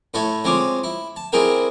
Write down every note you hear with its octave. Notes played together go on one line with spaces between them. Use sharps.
A2 E4 A4 C#5
G#3 C4 F4 C#5 D5
E4
A5
G3 C4 E4 G#4 A#4 G5